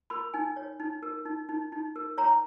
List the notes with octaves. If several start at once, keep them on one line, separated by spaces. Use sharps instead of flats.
A#4 B5
D#4 G#5
C#5
D#4
A#4
D#4
D#4
D#4
A#4
C#5 A#5